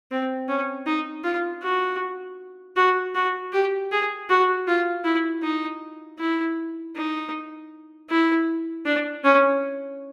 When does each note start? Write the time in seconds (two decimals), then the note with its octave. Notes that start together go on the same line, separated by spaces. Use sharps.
0.11 C4
0.48 C#4
0.87 D#4
1.24 F4
1.63 F#4
2.77 F#4
3.15 F#4
3.53 G4
3.92 G#4
4.30 F#4
4.68 F4
5.05 E4
5.43 D#4
6.19 E4
6.96 D#4
8.10 E4
8.86 D4
9.24 C#4